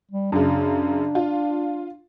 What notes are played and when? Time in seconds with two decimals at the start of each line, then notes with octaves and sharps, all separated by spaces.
0.11 G3
0.32 F#2 C#3 D4
1.15 F4